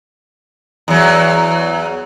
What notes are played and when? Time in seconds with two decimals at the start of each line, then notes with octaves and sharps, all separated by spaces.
0.88 E2 F#3